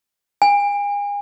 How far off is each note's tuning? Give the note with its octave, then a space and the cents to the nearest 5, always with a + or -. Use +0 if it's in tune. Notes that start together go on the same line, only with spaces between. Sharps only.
G#5 -35